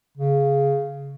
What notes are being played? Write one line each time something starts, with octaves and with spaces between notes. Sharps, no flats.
C#3